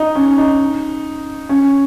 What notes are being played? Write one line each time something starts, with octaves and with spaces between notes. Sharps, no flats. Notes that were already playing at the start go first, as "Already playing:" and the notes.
Already playing: D#4
C#4
D#4
C#4